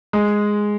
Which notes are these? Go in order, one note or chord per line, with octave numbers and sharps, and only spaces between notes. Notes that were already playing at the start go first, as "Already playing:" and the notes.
G#3